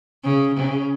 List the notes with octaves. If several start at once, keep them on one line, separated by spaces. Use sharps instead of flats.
C#3
C#3